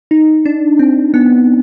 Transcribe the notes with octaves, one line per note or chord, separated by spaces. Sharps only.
D#4
D4
C4
B3